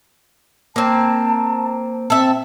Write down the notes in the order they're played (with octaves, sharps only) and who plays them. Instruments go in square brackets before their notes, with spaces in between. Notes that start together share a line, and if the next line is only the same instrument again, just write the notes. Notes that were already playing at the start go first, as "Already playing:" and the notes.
[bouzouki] A#3 C4 [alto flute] A5
[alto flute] C4 [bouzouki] A4 E5